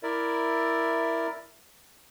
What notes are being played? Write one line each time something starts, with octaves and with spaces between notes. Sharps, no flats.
E4 A#4 D5 E5